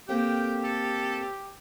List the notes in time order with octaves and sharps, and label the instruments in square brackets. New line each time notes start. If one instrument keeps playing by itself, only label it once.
[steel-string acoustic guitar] A3 A#3 C4 [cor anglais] G4 [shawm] G5
[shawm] A4